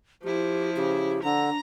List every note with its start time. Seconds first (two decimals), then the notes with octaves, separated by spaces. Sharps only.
0.24 F3 E4 G4
0.76 C#3 G4
1.24 D3 D4 A#5